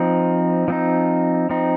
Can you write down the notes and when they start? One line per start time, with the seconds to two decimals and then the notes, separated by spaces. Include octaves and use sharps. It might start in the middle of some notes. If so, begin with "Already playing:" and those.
Already playing: F3 C4 D#4
0.68 F3 C4 D#4
1.49 F3 C4 D#4